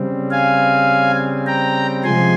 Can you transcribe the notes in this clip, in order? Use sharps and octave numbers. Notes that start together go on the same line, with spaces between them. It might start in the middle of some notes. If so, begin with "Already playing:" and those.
Already playing: C#3 G3 C4
F5 G#5
G5 A#5
C3 F3 G#3 G#5 C6